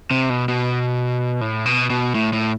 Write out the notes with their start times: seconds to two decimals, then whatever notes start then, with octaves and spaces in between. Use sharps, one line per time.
0.11 C3
0.30 B2
0.48 B2
1.41 A2
1.66 B2
1.90 B2
2.15 A2
2.33 A2